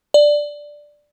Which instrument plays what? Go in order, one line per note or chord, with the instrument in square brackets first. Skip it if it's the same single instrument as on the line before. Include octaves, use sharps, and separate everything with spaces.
[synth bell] D5